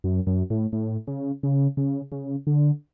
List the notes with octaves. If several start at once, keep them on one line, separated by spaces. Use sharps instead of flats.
F#2
F#2
A2
A2
C#3
C#3
C#3
C#3
D3